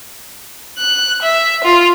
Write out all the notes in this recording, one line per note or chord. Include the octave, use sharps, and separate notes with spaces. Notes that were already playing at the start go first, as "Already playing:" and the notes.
F#6
E5
F4